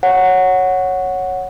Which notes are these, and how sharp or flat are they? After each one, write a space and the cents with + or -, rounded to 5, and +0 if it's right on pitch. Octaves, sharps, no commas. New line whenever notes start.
C#5 +0 F#5 -5